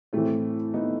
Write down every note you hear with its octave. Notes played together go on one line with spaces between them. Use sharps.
A2 E3 A3 C4
B3 D#4